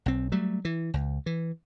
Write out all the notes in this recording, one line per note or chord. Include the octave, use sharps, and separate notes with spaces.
B1 C4
F#3 G3 A3
E3
C#2
E3